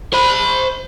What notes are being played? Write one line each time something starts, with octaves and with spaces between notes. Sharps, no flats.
C5 B5